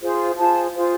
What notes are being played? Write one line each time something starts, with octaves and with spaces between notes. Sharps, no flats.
F4 G#4 C5
F4 G#4 C5 A5
F4 G#4 C5